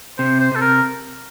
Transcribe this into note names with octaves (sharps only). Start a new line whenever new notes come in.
C3 C5
C5
C3 A4
A#4